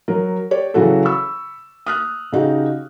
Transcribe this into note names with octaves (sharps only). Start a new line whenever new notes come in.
F#3 A#4
G4 C#5 D5
C#3 E3 F#3 F#4 A4
B5 C#6 E6
D#6 F6 F#6
C#3 D#4 F#4 G4